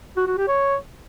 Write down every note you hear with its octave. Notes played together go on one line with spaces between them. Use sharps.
F#4
F#4
G4
C#5